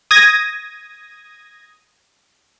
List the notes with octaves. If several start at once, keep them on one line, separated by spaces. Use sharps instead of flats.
D#6 G#6 A#6